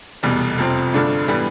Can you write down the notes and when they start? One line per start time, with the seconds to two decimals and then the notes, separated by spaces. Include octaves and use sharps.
0.23 F1 E2 B2 G3
0.58 F1 F2 C3 F3 C4
0.93 G2 D3 A3 D4 F4
1.28 A2 E3 G3 B3